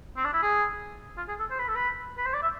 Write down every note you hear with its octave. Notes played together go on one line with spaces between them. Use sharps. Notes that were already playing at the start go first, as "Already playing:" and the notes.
C4
D4
E4
G#4
F4
G#4
A4
C5
B4
A4
B4
B4
C5
D5
E5